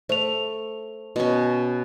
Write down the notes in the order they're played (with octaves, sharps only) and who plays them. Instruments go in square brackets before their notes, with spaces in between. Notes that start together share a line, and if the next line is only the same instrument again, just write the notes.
[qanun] A3 [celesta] C5 F7
[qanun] B2 C#4